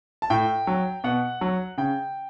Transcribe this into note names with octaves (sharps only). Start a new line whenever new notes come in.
A5
A2 G5
F#3
B2 F#5
F#3
C#3 G5